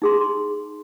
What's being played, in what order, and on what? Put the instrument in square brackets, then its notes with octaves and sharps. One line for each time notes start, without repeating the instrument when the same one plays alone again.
[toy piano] D#4 G#4 C6